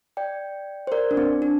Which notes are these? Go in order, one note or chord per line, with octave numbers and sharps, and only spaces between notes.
D5 G5
C5
A#4 D5
D4
C4
D4